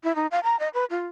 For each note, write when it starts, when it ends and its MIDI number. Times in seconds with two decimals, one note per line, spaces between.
0.04 0.15 64
0.16 0.27 63
0.31 0.40 77
0.44 0.58 82
0.59 0.69 75
0.74 0.85 71
0.90 1.07 65